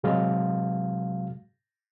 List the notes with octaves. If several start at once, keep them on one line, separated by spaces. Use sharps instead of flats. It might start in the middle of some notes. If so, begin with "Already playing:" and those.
C2 C3 F#3 G#3 F#4 F5